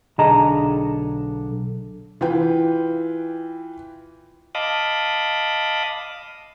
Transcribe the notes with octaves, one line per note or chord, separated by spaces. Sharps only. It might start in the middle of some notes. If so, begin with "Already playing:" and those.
B1 D3 G#4 D#5 A5 A#5
E3 F4 B4 G5
D#5 F5 A5 B5 D6 D#6